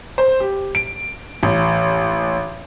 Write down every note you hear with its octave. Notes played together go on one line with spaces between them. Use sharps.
C5
G4
D7
A1